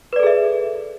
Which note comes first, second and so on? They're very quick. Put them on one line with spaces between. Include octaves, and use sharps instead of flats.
B4 D5 A4 G#4 E5